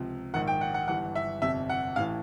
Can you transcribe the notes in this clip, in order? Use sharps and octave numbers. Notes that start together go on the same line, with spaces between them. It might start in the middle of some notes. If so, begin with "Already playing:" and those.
Already playing: C#2 C3 F3
A#1 G#2 D#3 F#5
G5
F#5
F#5
G1 G2 E3 F#5
E5
G1 F2 C3 E5
F#5
A1 A2 E3 F5